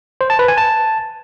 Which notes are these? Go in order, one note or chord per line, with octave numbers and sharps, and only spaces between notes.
C5
A5
B4
G#5
A5